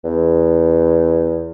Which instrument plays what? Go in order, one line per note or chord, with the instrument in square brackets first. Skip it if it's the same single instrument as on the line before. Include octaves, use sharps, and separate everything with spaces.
[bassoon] E2